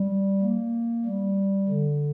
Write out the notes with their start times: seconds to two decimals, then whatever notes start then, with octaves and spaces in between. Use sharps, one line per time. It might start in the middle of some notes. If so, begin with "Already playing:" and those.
Already playing: G3
0.41 A#3
1.05 G3
1.69 D3